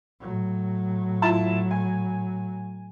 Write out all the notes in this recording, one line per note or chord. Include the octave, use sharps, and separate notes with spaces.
A2 F#3
E4 F4 A5
G#5